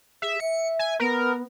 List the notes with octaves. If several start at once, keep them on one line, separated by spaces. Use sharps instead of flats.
G#4 E5
E5 C#7
G#5
B3 A#4